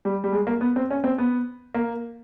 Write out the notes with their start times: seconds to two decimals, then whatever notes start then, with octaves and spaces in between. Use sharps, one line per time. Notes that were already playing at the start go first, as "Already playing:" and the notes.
0.05 G3
0.24 G3
0.33 G#3
0.47 A#3
0.61 B3
0.76 C4
0.91 C#4
1.04 C4
1.18 B3
1.74 A#3